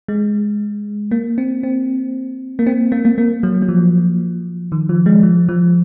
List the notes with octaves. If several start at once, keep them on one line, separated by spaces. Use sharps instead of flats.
G#3
A#3
C4
C4
A#3
C4
A#3
A#3
A#3
F#3
F#3
F3
D#3
F3
G#3
F3
F3